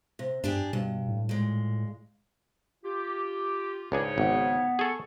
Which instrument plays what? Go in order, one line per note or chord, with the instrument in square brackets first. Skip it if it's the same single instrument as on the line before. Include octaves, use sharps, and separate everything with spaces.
[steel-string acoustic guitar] C3
[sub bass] G2 [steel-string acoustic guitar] D4 G4 G#4
[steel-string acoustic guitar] G2 [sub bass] B2
[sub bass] A2
[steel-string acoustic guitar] A#2 G#3
[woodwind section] F4 G4
[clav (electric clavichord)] C#2 D4 G#4 [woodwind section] G#2 C#3 C#5
[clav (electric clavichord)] G#1 [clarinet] B3
[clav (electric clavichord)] G#4 A4 [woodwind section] C#6